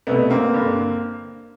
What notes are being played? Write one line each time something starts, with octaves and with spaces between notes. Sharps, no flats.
C2 B2 A3 B3
A#3 C4
G2 D3